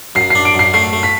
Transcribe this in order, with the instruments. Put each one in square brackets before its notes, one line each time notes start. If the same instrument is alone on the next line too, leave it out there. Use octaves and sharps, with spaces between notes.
[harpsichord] F#2 [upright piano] C7
[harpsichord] D4 [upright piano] C7
[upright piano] D7
[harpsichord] F#2 [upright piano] C7
[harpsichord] A3 [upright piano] C7
[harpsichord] A3
[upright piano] B6